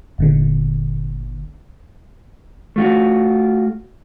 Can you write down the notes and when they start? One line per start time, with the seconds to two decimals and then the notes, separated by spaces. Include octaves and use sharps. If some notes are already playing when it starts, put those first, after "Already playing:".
0.18 G1 A#2 D3
2.76 A3 F4 F#4